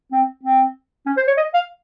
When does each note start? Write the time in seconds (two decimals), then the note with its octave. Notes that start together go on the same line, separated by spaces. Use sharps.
0.12 C4
0.43 C4
1.06 C#4
1.17 C5
1.27 C#5
1.37 D#5
1.54 F5